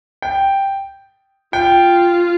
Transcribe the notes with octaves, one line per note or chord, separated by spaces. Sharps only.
G5
F4 G5